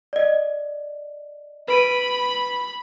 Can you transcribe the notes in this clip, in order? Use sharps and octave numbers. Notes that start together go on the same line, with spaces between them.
D5 D#5
B4 B5 D7 D#7